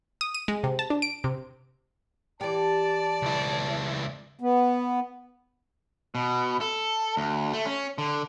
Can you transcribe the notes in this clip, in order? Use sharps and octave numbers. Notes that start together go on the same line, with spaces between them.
D#6
D#7
G#3
C3
A5
D4
D7
C3
E3 G4 D5 A5
C#2 E4
B3
B2
A4
D2
A3
C#4
D3